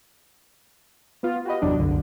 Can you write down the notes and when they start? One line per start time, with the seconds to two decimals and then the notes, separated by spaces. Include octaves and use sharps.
1.23 B3 F4
1.45 F#4 G4 B4 D#5
1.62 G1 E2 C3 F#3 D4
1.77 C2 F#2 D3